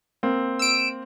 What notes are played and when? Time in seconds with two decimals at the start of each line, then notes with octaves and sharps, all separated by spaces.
0.23 A#3 C4
0.59 E6 D7